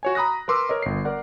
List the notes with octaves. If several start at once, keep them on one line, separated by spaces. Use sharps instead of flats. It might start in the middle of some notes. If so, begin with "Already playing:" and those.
F#4 C#5 G#5
A#5 B5 D#6 F#6 A#6
A#4 B4 C6 D6 E6
A#4 C#5 D#5
G1 C7
A#4 D5 F#5